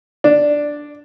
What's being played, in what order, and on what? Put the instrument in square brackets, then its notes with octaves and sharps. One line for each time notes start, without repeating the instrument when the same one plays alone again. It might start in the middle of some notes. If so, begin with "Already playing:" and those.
[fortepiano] D4